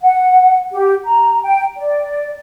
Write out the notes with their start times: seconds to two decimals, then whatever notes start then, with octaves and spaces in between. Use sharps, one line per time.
0.02 F#5
0.73 G4
1.06 A#5
1.43 G5
1.77 D5